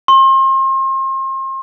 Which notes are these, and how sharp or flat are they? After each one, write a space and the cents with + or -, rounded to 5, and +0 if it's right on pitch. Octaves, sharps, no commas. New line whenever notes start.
C6 +35